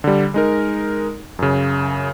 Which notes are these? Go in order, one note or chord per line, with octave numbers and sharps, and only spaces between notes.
D3 G3
G#3 D#4 A#4
F#2 C#3